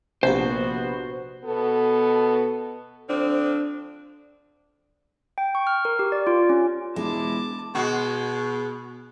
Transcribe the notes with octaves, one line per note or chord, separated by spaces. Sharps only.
A#1 C3 A#3 B3 F#4 G4 C5
B2 B3 A4
D3 F3 C4 D4
G5
C#6
F6
A#4
G4
D5
F4
C#4
E1 G#3 E4 A5 D6
B2 G#3 F#4